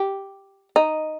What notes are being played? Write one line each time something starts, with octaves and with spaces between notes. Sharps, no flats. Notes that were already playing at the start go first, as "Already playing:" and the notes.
Already playing: G4
D#4